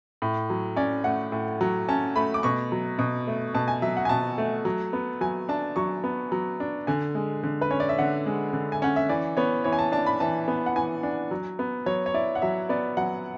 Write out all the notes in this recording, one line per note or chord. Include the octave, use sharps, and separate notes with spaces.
A2
F#3
C#4 D5
A3 F#5
A2
F#3
C#4 A5
A3 B5
D6
B2 C#6
F#3
B2
A3
B2 A5
G#5
F#3 E5
F#5
G#5
B2 A5
A3
F#3
B3
F#3 G#5
D4 A5
F#3 C#6
B3
F#3
D4
D3 G#5
G#3
D3
B4
C#4 C#5
D5
E5
D3 F#5
G#3
D3
G#5
C#4 F#5
E5
E3 D5
B3 C#5
E3 C#5
G#5
A5
D4 A5
B5
E3 A5
B3
F#5
E3 G#5
D4
F#3
B3
F#3 C#5
C#5
E4 D5
F#5
F#3 E5
B3 D5
F#3 F#5